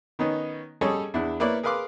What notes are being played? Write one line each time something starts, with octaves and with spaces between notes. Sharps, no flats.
D#3 B3 C#4 D#4
G3 C#4 G#4 A4 C#5 D#5
E2 D4 E4
A#3 B3 E4 B4 C#5 D5
G#4 A#4 B4 F5 C6 D6